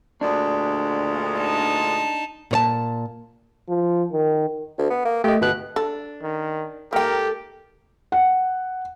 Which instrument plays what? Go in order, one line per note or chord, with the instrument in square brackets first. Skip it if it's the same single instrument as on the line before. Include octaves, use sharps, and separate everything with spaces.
[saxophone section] D2 A#2 G#3 [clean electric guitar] D4
[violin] D#4 A5
[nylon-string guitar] A#2 C#5 A5
[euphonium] F3
D#3
[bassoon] D2
B3
A#3
[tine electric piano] A3 D#5 [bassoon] G4
[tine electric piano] G1 F#6 [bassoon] B2
[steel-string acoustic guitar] D4 [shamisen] A4
[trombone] D#3
[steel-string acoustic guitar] G#2 A4 [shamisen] A#3 G5 [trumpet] G4 [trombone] A#4
[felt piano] F#5